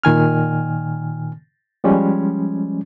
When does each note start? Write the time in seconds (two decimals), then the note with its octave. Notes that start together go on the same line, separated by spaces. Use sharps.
0.04 A#2 D#3 G#5 F6
1.84 F3 G3 G#3 C#4